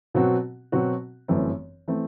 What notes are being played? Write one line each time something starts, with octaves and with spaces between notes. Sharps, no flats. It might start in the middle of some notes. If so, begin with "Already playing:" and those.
B2 F#3 C4 F#4
B2 F#3 C4 F#4
G1 F#2 E3 A3 C4
E3 A3 C4